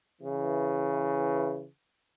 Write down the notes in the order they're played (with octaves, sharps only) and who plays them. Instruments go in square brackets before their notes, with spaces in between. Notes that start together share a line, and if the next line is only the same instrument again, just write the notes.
[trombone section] C#3 E3